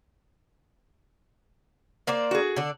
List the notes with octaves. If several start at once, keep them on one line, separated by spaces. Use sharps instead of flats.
A#3 C5 D5
F#4 G#4
D3 D4